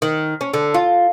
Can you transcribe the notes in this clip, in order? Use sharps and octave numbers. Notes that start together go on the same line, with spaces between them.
D#3
C#4
D3
F4